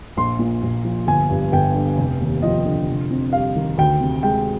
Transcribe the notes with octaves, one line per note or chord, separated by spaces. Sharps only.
A#1 C6
A#2
A#1
F3
G1 G#5
G2
G1 G5
D3
F1
D#2
F3 D#5
D3
F1
F2
G3 F5
D#3
D2 G5
C3
G#3 G5